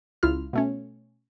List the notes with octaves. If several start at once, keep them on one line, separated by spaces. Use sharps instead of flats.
C#2 E4 F4 F6
B2 A3 C#4